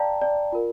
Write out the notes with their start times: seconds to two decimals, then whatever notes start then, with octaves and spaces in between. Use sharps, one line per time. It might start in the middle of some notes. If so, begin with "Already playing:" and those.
Already playing: D5 F5 G5 A5 A#5
0.21 D5
0.52 F4 A#4